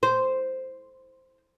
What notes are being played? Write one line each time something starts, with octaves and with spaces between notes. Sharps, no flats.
C5